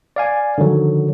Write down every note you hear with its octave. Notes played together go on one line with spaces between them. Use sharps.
D5 F5 G#5
D3 D#3 F3 F#3